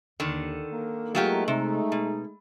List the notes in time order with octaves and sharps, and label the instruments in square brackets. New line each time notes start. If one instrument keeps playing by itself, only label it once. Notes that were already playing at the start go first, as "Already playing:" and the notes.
[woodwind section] D#2 [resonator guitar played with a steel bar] D3 D#3
[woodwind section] A#3 D#4 A#4
[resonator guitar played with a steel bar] F#3 F4 G4 [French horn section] G#3 A3
[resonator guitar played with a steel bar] C3 [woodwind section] D#4
[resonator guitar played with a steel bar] B2